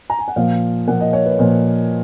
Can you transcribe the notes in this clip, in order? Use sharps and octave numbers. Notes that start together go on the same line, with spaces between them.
A#5
G#5
F#5
A#2 F3 A#3 F5
A#2 F3 A#3 F#5
D#5
C#5
B4
A#2 F3 A#3